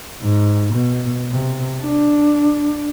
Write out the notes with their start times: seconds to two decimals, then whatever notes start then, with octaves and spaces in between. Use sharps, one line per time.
0.22 G#2
0.74 B2
1.31 C3
1.81 D4